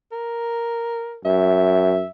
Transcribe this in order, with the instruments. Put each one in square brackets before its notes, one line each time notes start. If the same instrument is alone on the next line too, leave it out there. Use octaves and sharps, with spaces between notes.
[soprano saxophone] A#4
[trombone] F#2 [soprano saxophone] E5